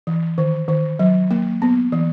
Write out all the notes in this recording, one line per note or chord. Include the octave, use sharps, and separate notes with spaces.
E3
D#3
D#3
F#3
A#3
B3
E3